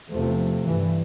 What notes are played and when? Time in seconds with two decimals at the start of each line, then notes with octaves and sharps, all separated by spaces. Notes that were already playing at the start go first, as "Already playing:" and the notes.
0.09 E2 C3 F3 A3
0.66 G2 E3